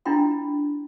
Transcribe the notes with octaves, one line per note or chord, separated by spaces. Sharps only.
D4 E4 F4 G5 C6